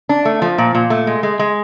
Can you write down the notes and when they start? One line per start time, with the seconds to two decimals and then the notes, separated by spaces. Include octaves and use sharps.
0.09 D4
0.25 A3
0.42 F3
0.58 A#2
0.75 A#2
0.90 A3
1.07 G#3
1.23 G#3
1.39 G#3